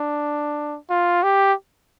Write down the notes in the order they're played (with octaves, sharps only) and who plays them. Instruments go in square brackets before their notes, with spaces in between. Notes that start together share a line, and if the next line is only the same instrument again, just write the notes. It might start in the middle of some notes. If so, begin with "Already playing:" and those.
Already playing: [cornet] D4
F4
G4